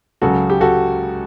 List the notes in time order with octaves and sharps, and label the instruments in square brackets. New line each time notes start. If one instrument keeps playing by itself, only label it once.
[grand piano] C#2 C#3 F#3 F#4 A4
G4
F#4 A4